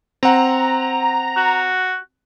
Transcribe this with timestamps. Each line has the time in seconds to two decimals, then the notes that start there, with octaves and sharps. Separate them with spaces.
0.23 C4 F#5 A#5
1.37 F#4